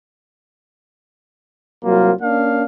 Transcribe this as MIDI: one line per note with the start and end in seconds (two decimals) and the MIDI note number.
1.84 2.12 36
1.84 2.12 54
1.84 2.12 58
1.84 2.12 65
2.21 2.64 58
2.21 2.64 61
2.21 2.64 62
2.21 2.64 77